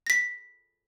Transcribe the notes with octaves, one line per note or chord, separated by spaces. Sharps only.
A#6 B6